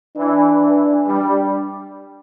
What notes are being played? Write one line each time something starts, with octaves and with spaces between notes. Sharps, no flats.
E3 D4
E3
G3 D4